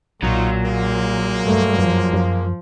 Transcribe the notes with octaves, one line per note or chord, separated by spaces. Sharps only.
B1 A#2 F#3 D#4 F4 F#4
G#3 A#3
G2 A3
F#2 F3
F#2